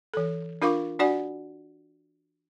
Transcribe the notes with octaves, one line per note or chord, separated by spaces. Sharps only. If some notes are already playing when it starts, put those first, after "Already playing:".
E3 A4
D4 F4 A#4 F5 C#6 D6
D4 F#4 D5 F#5 G#5